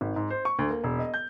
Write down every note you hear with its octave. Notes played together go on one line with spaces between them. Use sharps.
G#1
G#2
C5
C#6
D2
A#3
E1
D#5
G6